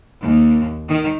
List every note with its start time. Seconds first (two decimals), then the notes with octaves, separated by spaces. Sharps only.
0.21 D#2
0.89 D#3